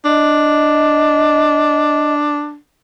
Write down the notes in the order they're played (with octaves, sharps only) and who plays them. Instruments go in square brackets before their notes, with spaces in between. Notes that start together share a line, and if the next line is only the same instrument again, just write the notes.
[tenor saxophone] D4 [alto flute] D#5